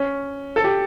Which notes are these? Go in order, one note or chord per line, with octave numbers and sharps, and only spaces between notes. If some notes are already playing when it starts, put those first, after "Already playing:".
Already playing: C#4
A4
G4